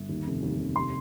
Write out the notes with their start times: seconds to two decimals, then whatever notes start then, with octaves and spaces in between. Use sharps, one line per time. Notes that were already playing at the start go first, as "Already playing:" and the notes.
Already playing: G1
0.09 D#2
0.26 F1
0.43 D#2
0.59 F1
0.76 C3 C6